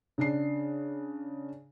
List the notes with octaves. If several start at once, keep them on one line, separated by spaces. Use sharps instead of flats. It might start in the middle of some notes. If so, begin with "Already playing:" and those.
C#3 D4 C7